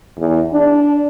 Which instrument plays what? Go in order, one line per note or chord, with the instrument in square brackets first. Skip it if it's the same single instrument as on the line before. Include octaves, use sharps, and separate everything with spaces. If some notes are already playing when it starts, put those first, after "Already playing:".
[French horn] E2
D4